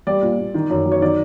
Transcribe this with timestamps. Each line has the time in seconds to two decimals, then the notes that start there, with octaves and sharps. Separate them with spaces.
0.07 G3 D5
0.22 A#2
0.39 A#2
0.54 D#3
0.70 F#2
0.86 F#3
0.92 C#5
1.02 D#3 D5